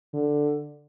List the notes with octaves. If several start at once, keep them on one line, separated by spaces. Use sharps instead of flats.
D3